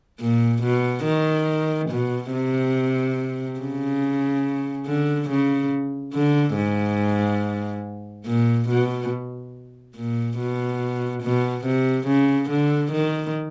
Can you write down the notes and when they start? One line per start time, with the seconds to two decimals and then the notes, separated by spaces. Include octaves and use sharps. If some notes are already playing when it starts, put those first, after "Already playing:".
0.20 A#2
0.63 B2
1.04 D#3
1.90 B2
2.32 C3
3.60 C#3
4.86 D3
5.29 C#3
6.14 D3
6.56 G#2
8.26 A#2
8.69 B2
9.96 A#2
10.38 B2
11.23 B2
11.65 C3
12.07 C#3
12.49 D3
12.92 D#3